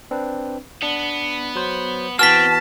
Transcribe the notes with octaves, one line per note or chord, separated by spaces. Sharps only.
C4 D4 B4
B3 D4 C#7
F#3 C5
E3 B3 C4 F#4 A5 F6 B6